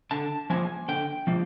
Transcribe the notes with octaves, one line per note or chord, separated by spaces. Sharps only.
D3 A5
F3 A#3 G#5
D3 G5
F3 A#3